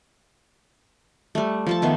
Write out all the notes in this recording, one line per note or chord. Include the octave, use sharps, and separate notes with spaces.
G3 A3
F3 A4 A5
D#3 B3 E5 C6